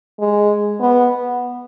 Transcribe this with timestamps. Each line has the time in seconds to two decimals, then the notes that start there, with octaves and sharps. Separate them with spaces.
0.19 G#3
0.80 B3